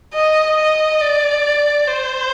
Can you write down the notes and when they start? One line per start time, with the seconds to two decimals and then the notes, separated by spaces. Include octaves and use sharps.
0.14 D#5
0.57 D#5
1.00 D5
1.88 C5